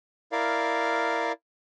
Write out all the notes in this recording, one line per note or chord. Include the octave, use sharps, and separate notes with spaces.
E4 A#4 D5 F5